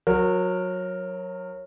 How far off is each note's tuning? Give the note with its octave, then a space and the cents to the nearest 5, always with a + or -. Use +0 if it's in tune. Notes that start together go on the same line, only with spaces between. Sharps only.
F#3 -20 A#4 +0